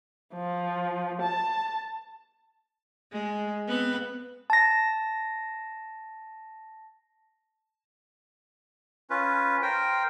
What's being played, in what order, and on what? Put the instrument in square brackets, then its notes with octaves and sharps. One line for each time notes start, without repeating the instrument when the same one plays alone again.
[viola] F3
A5
[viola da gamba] G#3
B3 C4 B4
[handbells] A5 A#6
[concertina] C#4 F4 B4
A#4 C5 G5